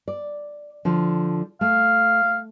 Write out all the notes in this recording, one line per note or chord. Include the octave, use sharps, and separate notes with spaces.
D5
D3 F3
A3 F5